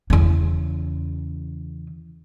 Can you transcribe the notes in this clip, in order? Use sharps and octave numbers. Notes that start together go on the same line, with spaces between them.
E2 C#3